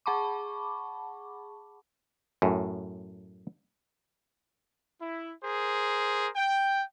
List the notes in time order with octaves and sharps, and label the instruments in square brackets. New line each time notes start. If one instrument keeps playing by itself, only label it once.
[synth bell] G#4 F#5 A5 B5 C#6 D6
[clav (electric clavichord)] F#2 A2
[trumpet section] E4
G#4 A#4 C5
G5